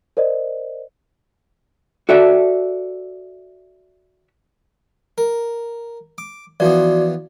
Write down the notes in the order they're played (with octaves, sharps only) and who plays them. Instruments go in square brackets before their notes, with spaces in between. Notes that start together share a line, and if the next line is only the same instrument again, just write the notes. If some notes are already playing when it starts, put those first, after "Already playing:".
[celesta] A#4 C5 D5 D#5
[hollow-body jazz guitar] F#4 A4 D5 E5
[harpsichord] A#4
D6
[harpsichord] E3 F3 B3 [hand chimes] F#4 D5